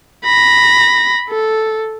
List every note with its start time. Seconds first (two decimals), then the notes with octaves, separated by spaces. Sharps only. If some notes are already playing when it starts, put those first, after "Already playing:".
0.24 B5 A#6
1.29 A4